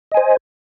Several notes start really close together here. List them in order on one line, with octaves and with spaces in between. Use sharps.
D#5 G#5 C5